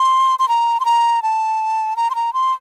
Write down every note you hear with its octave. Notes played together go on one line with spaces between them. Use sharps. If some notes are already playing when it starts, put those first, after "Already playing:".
Already playing: C6
C6
A#5
C6
A#5
A5
A#5
C6
A#5
C6